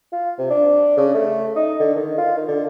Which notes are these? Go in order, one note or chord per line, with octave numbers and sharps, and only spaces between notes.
F4
C3
D4
C#3
A3
D#4
D3
D#3
F4
D#3
D3